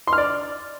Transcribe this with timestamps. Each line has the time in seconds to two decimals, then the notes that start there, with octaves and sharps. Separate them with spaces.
0.07 C6
0.13 F6
0.18 D5